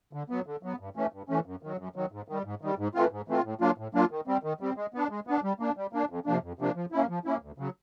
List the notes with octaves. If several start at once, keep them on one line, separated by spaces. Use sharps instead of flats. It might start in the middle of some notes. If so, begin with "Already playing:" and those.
D3
F#3 B3
D3
F#3 B3
G2
E3 A3 C#4
G2
E3 A3 C#4
F#2
D#3 F#3
F#2
D#3 F#3
G#2
D#3 G3
G#2
D#3 G3
G#2
E3 A3 C4 F4
G#2
E3 A3 C4 F4
A2
F#3 A#3 D4 F4
A2
F#3 A#3 D4 F4
D#3
G3 C4
D#3
G3 C4
G#3
B3 D4
G#3
B3 D4
G3
A#3 D4
G3
A#3 D4
F2
C3 F3 A#3 D4
F2
C3 F3 A#3 D4
F3
A#3 C#4 E4
F3
A#3 C#4 E4
D2
C#3 F#3